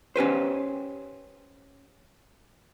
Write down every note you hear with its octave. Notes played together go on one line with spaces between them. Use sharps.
C#4 G4 B4 C5